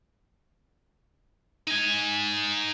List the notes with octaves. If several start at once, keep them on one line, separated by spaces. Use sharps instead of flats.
D#4 G#5